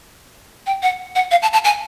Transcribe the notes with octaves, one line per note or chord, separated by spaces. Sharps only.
G5
F#5
F#5
F5
A5
A5
G#5